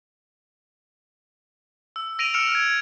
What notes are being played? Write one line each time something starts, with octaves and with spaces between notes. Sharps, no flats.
E6
E6 A#6 D7 D#7 F7
E6 F6 C#7 D7 E7 F7
G#6 D7